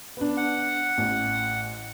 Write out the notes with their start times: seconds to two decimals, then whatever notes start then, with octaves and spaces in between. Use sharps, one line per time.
0.17 B3 D4
0.37 F#5
0.98 A1